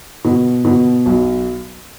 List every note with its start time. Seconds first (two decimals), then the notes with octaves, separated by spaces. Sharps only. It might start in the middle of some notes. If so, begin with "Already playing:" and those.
0.24 B2
0.65 B2
1.06 B1